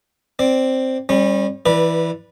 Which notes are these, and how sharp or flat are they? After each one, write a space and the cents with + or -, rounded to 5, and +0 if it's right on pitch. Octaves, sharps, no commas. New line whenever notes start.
C4 +0 D5 -5
G3 +20 C#4 -35
E3 +0 B4 -20 D5 +5